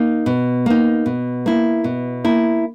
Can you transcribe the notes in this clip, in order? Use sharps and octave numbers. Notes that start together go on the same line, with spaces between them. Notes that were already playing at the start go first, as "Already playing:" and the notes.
Already playing: A#3 D#4
B2
A#3 D#4
B2
A#3 E4
B2
A#3 E4